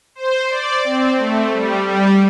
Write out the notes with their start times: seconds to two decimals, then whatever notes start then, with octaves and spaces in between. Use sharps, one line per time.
0.15 C5
0.49 D5
0.84 C4
1.18 A3
1.53 G3
1.87 G3